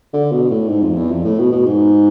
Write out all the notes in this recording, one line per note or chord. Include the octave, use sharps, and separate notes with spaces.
D3
B2
A2
G#2
F2
E2
F2
A2
B2
B2
G#2